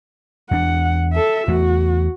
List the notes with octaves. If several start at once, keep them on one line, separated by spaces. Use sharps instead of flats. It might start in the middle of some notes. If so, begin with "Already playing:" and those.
E2 D4 F#5
A4 E5
E2 A3 F#4